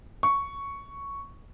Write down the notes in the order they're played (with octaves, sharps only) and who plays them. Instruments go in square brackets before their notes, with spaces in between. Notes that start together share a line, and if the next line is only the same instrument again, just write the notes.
[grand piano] C#6